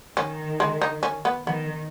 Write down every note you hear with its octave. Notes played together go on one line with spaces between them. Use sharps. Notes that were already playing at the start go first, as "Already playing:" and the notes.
D#3 C#4
G#3
D#4
C#4
B3
D#3 B3